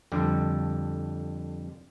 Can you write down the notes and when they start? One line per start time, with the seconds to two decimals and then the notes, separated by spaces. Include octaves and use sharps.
0.12 F2 D3 G3